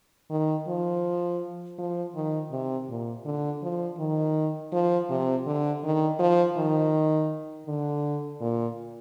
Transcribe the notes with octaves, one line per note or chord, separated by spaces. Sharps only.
D#3
F3
F3
D#3
C3
A#2
D3
F3
D#3
F3
C3
D3
D#3
F3
D#3
D3
A#2